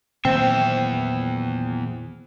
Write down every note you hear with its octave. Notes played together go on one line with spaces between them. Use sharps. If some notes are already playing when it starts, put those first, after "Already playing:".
E2 A#2 D#3 F#3 C4 C5 E5 G5